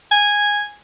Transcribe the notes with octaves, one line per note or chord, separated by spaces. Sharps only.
G#5